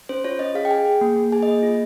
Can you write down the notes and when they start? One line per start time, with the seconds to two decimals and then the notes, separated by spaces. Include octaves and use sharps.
0.09 C#4 C5
0.24 F4 C#5
0.39 C#4 D#5
0.55 G#4 F5
0.65 G5
0.71 G#4 G#5
0.86 G#4
1.01 A#3
1.16 A#3
1.32 G#4 G#5
1.43 D#5
1.48 A#3
1.63 F4